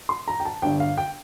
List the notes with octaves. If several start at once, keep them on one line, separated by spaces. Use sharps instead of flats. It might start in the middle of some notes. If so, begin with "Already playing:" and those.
C6
A#5
G5
A5
G1 G2 D3 G5
F5
G5